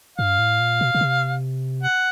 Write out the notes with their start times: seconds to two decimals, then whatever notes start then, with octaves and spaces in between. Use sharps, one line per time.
0.18 G2 F5
0.39 A2
0.60 A#2
0.81 B2
0.95 B2
1.01 C3
1.83 F#5